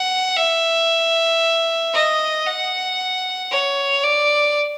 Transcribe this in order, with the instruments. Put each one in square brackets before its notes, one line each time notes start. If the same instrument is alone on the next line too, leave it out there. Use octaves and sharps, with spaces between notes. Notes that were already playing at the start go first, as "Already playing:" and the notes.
Already playing: [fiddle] F#5
E5
D#5
F#5
C#5
D5